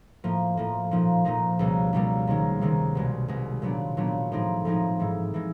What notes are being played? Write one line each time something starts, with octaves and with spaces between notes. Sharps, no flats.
A2 F3 A#3
A2 F3 A#3
A#2 F3 A#3 D#4
A#2 F3 A#3 D#4
C#2 B2 G3 A#3
C#2 B2 G3 A#3
C#2 C3 D#3 G#3
C#2 C3 D#3 G#3
C2 B2 G#3
C2 B2 G#3
A#2 F#3 B3 D4
A#2 F#3 B3 D4
A2 F3 G#3 C4 D#4
A2 F3 G#3 C4 D#4
G#2 E3 G#3
E3 G#3